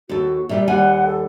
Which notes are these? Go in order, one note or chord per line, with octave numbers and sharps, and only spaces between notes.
D#2 F#4 A4
A#2 G3 G4 E5
D#2 G3 F#5 G#5
A4